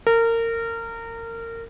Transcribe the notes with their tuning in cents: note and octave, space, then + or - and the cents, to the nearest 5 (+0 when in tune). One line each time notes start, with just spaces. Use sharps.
A#4 -25